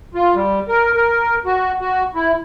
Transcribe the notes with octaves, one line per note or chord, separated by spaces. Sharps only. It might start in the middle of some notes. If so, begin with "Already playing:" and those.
F4
G3
A#4
A#4
F#4
F#4
E4